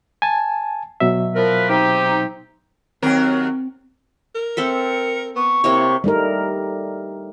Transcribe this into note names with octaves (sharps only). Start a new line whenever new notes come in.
G#5 A5
B2 F#3 E5
F3 A#4 B4
C4 D#4 G4
D#2 F#3 C4 A#4 G5
A#4
C4 A4 E5 C#7
B3 C#6
C3 A#3 E4 C#5
G3 A3 D#4 A#4